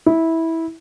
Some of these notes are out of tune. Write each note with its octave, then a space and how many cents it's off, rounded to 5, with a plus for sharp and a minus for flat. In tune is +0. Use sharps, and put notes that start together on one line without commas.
E4 -15